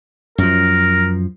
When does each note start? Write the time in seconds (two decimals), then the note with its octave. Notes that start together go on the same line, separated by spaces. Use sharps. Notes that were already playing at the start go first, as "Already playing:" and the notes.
0.38 F#2 F3 A#4